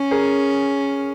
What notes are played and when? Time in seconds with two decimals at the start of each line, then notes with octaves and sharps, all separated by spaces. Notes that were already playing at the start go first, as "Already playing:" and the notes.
Already playing: C#4
0.11 G#4 A#4